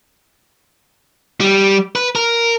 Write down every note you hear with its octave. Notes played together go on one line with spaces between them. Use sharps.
G3
B4
A#4